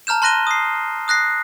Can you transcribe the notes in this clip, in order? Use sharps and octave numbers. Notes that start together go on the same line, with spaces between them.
A5 A#5 F6 G6 E7
A5 C6 F#6 A#6 D#7 G7
D#6 C7
D#6 F#6 A#6 C7